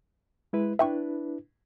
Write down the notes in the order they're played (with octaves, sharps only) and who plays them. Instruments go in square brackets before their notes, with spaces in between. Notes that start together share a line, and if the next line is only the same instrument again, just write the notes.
[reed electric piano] G#3 E4 B4
[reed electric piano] D4 E4 B4 [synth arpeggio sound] E5 G5 C#6